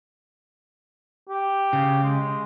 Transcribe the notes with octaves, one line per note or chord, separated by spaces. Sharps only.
G4
C#3
G#3